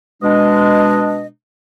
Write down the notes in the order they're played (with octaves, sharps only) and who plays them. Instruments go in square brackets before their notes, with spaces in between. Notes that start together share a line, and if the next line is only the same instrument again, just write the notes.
[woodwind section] B2 G#3 D4 D#5